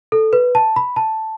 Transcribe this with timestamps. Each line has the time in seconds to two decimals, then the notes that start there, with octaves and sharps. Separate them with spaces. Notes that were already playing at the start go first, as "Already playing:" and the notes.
0.12 A4
0.33 B4
0.55 A5
0.76 B5
0.96 A5